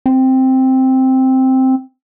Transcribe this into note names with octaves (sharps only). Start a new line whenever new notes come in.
C4